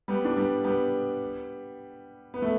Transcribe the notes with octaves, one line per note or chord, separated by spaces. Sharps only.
G3 B3
D4
G3 B3
G3 B3
B3
A3